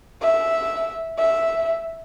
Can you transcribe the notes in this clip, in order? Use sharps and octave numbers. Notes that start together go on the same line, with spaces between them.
E5
E5